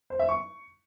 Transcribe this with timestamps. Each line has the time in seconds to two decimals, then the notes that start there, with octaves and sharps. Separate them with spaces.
0.10 C5
0.19 E5
0.29 C#6